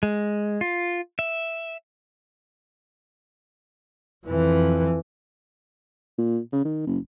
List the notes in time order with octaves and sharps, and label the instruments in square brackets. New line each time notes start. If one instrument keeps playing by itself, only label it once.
[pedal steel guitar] G#3
F4
E5
[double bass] F2 E3
[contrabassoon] A#2
C#3
D#3
F#1